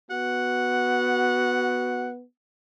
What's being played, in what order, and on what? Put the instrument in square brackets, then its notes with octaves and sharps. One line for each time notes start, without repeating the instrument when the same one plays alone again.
[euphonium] B3 [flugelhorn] F#4 [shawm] F#5